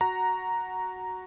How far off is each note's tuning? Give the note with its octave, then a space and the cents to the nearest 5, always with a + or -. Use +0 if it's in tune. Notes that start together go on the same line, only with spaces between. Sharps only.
F#4 +0 F#5 +0 A#5 +0